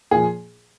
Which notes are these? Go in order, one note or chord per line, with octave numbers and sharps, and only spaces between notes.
A#2 F3 G#4